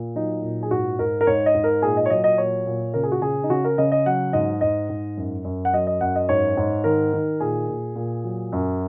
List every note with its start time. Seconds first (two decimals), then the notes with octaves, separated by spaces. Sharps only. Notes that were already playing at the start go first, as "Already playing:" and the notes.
Already playing: A#2
0.15 F#3 D#4
0.43 A#2
0.63 G#4
0.71 G#2 F#4
0.99 G#2 A#4
1.21 A#4
1.27 G#2 C#5
1.46 D#5
1.54 G#2
1.64 A#4
1.82 A#2 G#4
1.97 D#5
2.06 C#5
2.10 F#3 D#5
2.24 D#5
2.38 A#2 C#5
2.66 A#2
2.94 C#3 A#4
3.03 G#4
3.12 F#4
3.22 C#3 G#4
3.44 D#4
3.50 C#3 F#4
3.64 A#4
3.78 C#3 D#5
3.92 D#5
4.06 F#3 F#5
4.33 G#2 D#5
4.61 G#2 D#5
4.89 G#2
5.17 F#2
5.45 F#2
5.65 F#5
5.73 F#3 D#5
5.87 D#5
6.01 F#2 F#5
6.15 D#5
6.29 G#2 C#5
6.57 G#2
6.84 D#3 A#4
7.13 D#3
7.40 A#2 G#4
7.69 A#2
7.96 A#2
8.24 F#3
8.52 F#2